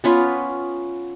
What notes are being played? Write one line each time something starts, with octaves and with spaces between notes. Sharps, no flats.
B3 C#4 F4 B4